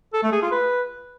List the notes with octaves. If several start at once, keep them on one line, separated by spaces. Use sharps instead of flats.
A4
A3
G#4
F4
B4